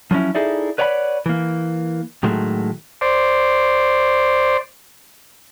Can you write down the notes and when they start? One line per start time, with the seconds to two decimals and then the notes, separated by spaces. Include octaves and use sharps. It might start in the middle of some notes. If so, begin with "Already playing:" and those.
0.11 F3 F#3 A#3 C#4 E4
0.35 D#4 E4 G#4 A4 D5 E5
0.78 B4 C#5 D5 F#5 G5 B5
1.26 E3 A#3
2.23 A2 D#3 F#3 G#3 A3
3.01 C5 D5